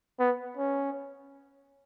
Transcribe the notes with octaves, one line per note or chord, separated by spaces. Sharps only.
B3
C#4